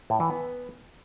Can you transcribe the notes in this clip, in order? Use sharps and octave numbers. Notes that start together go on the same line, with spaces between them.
A2
E3
B3